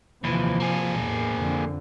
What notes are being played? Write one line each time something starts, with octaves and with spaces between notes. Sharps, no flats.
D#2 C3 E3 F3
A#3 G#4
E2 A2
F2 D3